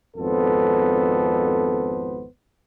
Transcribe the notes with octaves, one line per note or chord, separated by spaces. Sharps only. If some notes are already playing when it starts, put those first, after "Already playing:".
G#1 F2 B3 A4 C5